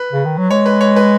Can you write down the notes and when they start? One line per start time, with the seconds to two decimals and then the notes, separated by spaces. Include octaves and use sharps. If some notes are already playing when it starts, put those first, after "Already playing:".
Already playing: B4
0.12 C#3
0.25 D#3
0.38 F#3
0.50 G#3 C#5
0.66 B4
0.81 C#5
0.96 B4